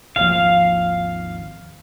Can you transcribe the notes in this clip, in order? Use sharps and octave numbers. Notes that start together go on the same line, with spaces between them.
G#1 D#2 F3 F5